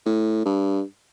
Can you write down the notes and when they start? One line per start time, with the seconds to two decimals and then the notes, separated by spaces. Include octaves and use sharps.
0.06 A2
0.45 G2